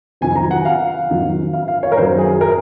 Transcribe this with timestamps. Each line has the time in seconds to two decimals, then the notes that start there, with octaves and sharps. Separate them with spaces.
0.21 F2 C3 D#3 F#3 G#5
0.36 A#5
0.51 F#5
0.65 F5
1.09 F2 D#3 F#3
1.53 F5
1.68 F5
1.83 C#5
1.92 A#4
1.97 F#2 D#3 F#3 C5
2.18 G#4
2.41 A#4